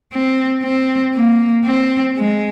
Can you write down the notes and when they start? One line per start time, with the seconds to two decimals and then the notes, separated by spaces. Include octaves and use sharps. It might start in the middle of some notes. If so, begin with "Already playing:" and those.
0.13 C4
0.63 C4
1.15 A#3
1.65 C4
2.17 G#3